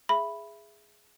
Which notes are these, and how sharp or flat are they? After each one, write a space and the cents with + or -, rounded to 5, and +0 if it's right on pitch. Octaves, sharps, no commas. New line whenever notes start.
G#4 +0 E5 +15 B5 +0